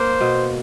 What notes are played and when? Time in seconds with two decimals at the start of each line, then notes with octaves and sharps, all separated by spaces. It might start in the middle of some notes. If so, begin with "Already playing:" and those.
Already playing: A#3 C5
0.21 B2